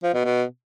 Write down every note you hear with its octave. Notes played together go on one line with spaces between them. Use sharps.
F3
B2
B2